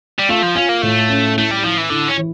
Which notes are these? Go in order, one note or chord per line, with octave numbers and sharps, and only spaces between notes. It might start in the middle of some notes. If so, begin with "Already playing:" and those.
G3
A3 F4
F3
C#4 F4
A#3
A2 A3
C#4
A3 E4
G3
F3 E4
E3
D3 E4
C#4
E3